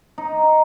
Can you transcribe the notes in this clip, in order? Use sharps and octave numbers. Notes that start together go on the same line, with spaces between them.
D#4